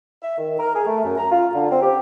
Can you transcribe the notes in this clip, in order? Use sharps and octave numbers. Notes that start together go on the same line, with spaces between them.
E5
D#3
A#4
G#4
A3
F#2
A#5
F4
D3
C4
G4